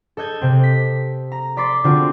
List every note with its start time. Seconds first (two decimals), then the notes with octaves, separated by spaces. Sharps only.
0.17 A4 D#5 G6 G#6
0.41 C3 C4
0.63 B6
1.32 A#5
1.57 D5 B5 C6 D6 A6
1.84 D3 B3 C4 F4 F#4